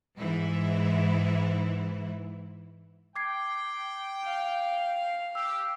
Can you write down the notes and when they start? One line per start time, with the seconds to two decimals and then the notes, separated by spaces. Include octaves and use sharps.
0.17 G#2 E3 E4
3.16 G5 D6 G#6 C7
4.24 F5
5.35 G4 E6